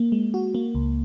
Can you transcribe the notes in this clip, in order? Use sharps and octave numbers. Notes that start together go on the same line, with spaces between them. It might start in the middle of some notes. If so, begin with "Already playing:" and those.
Already playing: A#3
G#3
F#4
A#3
C#2